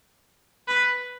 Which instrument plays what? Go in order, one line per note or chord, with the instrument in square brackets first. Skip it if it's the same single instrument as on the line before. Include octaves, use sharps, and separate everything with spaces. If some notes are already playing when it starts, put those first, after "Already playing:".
[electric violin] B4